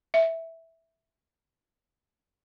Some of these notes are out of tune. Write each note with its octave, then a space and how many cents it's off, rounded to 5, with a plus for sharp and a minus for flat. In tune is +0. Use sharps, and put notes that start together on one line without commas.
E5 -5